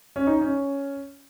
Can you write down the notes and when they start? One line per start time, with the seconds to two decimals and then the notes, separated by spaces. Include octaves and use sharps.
0.16 C#4
0.27 D#4
0.41 C#4